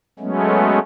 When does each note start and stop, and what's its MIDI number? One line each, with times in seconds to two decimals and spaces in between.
0.19 0.79 54
0.19 0.79 56
0.19 0.79 57
0.19 0.79 59
0.19 0.79 61